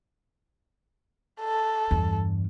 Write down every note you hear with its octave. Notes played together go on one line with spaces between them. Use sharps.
A4
E2 G2